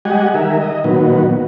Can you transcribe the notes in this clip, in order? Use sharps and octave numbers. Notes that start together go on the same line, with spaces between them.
G3 G#3 G4 D#5 F#5 G#5
D#3 A#4 E5
D#5
A#2 D#3 F#3 B3